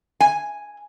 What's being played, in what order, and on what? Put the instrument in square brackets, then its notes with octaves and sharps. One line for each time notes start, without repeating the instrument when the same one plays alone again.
[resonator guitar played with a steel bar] G#5